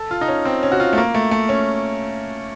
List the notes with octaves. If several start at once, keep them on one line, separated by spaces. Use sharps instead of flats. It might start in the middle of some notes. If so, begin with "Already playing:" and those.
Already playing: A4
F4
D#4
C#4
C4
C#4
F#4
F4
A3
A#3
A3
A3
C#4